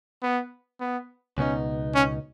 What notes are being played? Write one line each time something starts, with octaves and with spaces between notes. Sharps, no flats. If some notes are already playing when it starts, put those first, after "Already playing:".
B3
B3
C#2 B2 B3 C#4 D#4
C#4